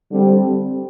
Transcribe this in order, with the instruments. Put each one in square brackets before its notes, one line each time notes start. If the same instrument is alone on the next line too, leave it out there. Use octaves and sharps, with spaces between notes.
[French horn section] D3 G3 C4